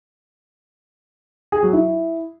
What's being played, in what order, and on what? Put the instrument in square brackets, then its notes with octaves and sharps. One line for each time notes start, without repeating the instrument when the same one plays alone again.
[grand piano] G#4
F#3
E4